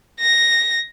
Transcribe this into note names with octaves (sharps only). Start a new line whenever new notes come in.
A#6